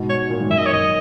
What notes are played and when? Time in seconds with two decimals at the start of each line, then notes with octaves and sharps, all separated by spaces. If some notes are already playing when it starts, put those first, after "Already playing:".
Already playing: G#2 B2
0.10 C#5
0.30 A#2
0.40 G#2
0.49 F#2 A#2 E5
0.58 D#5
0.66 C#5
0.72 F#2 D#5